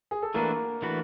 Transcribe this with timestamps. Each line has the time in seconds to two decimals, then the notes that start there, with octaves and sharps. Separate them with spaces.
0.11 G#4
0.22 A4
0.34 E3 A3 A#3 D4 F#4 A#4 B4
0.82 E3 A3 D4 F#4 B4